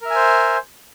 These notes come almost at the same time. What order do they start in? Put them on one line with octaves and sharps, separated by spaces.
A#4 E5 G#5 C5